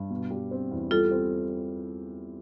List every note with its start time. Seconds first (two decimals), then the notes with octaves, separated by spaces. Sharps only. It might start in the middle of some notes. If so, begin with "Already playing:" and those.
Already playing: G2
0.10 B2
0.31 G3
0.51 C4
0.71 E2
0.91 G3 F4 A4
1.11 C4